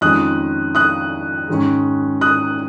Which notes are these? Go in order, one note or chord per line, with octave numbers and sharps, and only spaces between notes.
F2 D#3 G#3 C#4 D#6 F#6
D#6 F#6
G#2 D#3 G#3 C#4
D#6 F#6